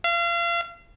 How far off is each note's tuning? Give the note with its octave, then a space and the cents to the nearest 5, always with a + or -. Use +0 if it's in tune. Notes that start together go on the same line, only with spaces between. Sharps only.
F5 -35